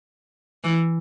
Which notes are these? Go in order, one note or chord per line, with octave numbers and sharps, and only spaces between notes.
E3